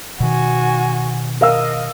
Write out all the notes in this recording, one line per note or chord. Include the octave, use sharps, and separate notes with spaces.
B2 D#3 F#4 G#5
A#4 D#5 F5 E6